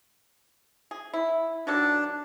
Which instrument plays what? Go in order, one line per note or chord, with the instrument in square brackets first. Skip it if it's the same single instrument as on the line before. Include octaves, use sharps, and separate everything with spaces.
[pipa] G#4
E4
[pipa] D#3 F#3 A4 [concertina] D4